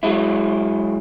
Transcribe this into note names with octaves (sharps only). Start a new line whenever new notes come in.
F#3 G#3 E4